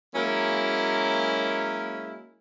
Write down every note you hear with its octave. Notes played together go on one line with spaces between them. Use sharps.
F#3 G#3 A#3 C#4 E4 A#4